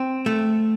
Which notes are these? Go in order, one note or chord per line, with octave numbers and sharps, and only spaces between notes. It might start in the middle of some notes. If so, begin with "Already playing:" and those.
Already playing: C4
A3